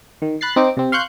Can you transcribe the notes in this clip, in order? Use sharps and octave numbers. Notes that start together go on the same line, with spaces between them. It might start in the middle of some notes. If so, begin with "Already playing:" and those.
D#3
B5 F#6 A6 C7
C4 D#4 D6
C3 C4
F5 C6 C#6 F#6 G6